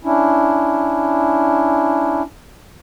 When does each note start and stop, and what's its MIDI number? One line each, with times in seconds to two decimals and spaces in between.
0.04 2.22 61
0.04 2.22 62
0.04 2.22 64